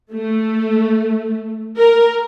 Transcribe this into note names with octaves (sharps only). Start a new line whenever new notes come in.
A3
A#4